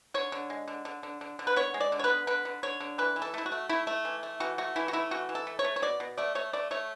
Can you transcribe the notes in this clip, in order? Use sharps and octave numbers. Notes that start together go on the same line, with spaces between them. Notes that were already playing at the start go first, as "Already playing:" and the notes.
D3 C#5
D3
G#3
D3
D3
D3
D3
D3
B4
B3 C#5
G#3
D5
D3
C#5
B4
B3
D3 B4
D3
D3 C#5
D3
E3 B4
E3
A4
A3 E4
F#4
A3
A3 E4
A3
E3
A3
E3 F#4
A3 F#4
E3 E4
F#4
A3 E4
E3 F#4
E3
A4
A3
C#5
A3
C#5
B2 D5
B2
A3 D5
A3 C#5
A3 D5
A3 C#5